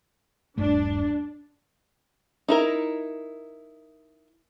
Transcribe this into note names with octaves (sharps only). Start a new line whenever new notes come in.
D#1 G2 A3 D4
D#4 E4 A#4